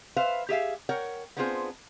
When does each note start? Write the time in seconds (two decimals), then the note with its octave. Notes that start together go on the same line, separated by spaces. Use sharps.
0.16 B4 C5 E5 F5
0.49 G4 G#4 E5 F5
0.89 A#4 C#5 F#5 G5
1.37 B3 C4 D4 F4 G#4 C5